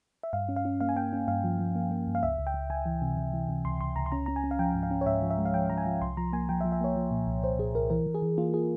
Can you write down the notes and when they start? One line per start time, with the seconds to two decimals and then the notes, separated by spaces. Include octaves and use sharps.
0.23 E5
0.33 G2 F5
0.49 C#4
0.56 F5
0.65 C#4
0.80 A#3 F5
0.89 G#5
0.96 A#3 G5
1.13 C#4
1.28 G2 F5
1.44 F3
1.59 F3
1.76 A#3
1.91 A#3
2.07 G2
2.15 F5
2.23 C#2 E5
2.38 C#2
2.47 G5
2.54 C#2
2.70 C#2 G#5
2.86 E3
3.02 C3
3.17 C3
3.33 E3
3.49 C3
3.64 C#2 C6
3.81 C#2 C6
3.96 C#2 A#5
4.06 C6
4.12 C#4 A#5
4.26 C#4 A#5
4.36 G#5
4.44 C#4
4.51 F5
4.59 F3 G5
4.75 G#2
4.83 F5
4.91 C#4
5.01 C#5
5.06 G#2 E5
5.22 F3
5.30 E5
5.38 G#3
5.45 F5
5.54 F3 G5
5.70 F3 A#5
5.78 G#5
5.86 F3
6.01 C2 C6
6.17 F3 A#5
6.33 A#3 G#5
6.49 F3 G5
6.61 E5
6.64 F3
6.72 E5
6.81 A#3 C#5
6.96 F3
7.11 A#2
7.27 C2
7.44 A#2 C5
7.59 A#2 G#4
7.75 C2 A#4
7.90 E3 A#4
8.06 E3
8.14 G#4
8.22 E3
8.38 A#3 F4
8.54 G#4